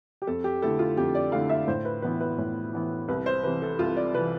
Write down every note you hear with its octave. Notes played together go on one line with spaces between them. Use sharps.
G4
F2 A4
G4
D3 A3 E4 A4
F4
F2 G4
D5
D3 A3 E4 F5
E5
A2 C5
B4
E3 B3 E4 B4
B4
A2
E3 B3 E4
C2 B4
C5
C3 E3 B4
A4
C2 F4
D5
C3 E3 B4